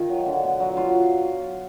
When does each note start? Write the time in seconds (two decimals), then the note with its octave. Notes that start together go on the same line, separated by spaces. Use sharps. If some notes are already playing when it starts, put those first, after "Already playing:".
Already playing: D#3 D#4 F4
0.09 F#3
0.26 D3
0.44 B2
0.60 F#3
0.77 F#3 F4